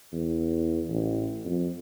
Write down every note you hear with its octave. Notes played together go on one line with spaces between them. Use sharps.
E2
A1
F2